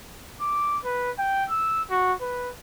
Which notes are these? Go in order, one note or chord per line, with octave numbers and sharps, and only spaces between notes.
D6
B4
G5
E6
F#4
B4